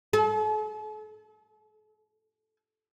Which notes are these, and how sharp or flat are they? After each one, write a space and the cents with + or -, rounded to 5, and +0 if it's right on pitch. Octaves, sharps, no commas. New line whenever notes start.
A4 -45